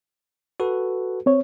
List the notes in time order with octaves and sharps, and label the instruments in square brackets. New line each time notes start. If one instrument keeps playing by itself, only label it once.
[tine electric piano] F#4 A4 B4
[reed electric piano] C4 C#5